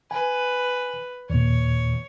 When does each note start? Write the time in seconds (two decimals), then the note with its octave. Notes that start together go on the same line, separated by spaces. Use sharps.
0.11 B4 G#5
1.30 D#2 A#2 C#5